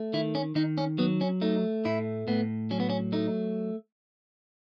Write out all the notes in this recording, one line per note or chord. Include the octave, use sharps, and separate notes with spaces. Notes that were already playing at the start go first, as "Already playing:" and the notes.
Already playing: A3
D#3 E4
C#4
D#3 D#4
C#4
F#3 B3
C#4
A3 D#4
A2 E4
A2 B3
F#3 C#4
B3
C#4
A3 D#4